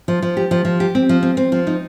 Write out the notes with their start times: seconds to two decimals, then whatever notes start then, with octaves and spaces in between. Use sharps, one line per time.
0.08 F3
0.22 F3
0.37 G4
0.51 F3
0.65 F3
0.80 G4
0.95 C4
1.09 F3
1.23 C4
1.37 C4
1.52 F3
1.67 D#4